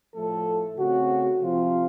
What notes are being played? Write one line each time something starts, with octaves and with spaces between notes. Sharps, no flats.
A2 F3 A3 A4
C#3 A3 C4 F#4
C3 F3 C4 F4